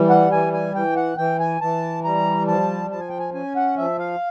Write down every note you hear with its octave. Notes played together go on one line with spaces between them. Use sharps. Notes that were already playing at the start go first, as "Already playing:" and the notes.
Already playing: E3 G3
F#5
E3 G#5
G#5
E3 G5
F#5
E3 G5
G#5
E3 A5
G3 A#5
F3 A5
F3 A5
G#5
G5
G#5
C#4 G#5
F#5
F3 E5
F5